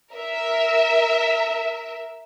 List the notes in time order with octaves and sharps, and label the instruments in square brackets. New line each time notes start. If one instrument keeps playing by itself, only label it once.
[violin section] A#4 E5